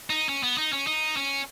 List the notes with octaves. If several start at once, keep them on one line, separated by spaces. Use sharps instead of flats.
D#4
C#4
B3
D#4
C#4
D#4
C#4